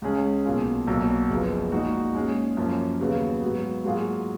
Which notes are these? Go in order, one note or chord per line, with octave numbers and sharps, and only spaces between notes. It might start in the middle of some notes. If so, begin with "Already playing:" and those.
C#2 C#3 G#3 C#4 G#4
B1 B2 A#3 F4 G#4
B1 A#2 F#3 A#3
F#1 F#2 F3 B3
A#2 G#3 D#4 F#4
A#2 G#3 C#4 G#4
F#2 F3 A#3 C#4
D#2 C#3 F#3 B3
G#2 F#3 B3
G#2 F#3 A#3 F4 G#4